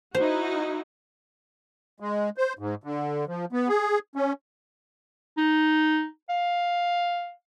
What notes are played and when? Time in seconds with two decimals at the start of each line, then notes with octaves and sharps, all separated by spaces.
0.15 D#4 E4 F#4 C5
2.00 G#3
2.37 C5
2.59 G#2
2.84 D3
3.28 F3
3.53 B3
3.68 G#4
4.16 C#4
5.38 D#4
6.29 F5